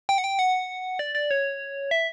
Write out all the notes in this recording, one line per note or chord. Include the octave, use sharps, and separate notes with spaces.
G5
F#5
G5
F#5
D5
D5
C#5
E5